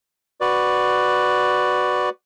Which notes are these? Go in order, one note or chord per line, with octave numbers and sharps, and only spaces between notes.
F#4 B4 D5